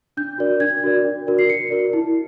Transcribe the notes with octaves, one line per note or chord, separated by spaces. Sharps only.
D4 G6
F#4 A#4 D5
D4 G#6
F#4 A#4 D5
D4
F#4 A#4 D5
C7
D4 C#7
F#4 A#4 D5
E4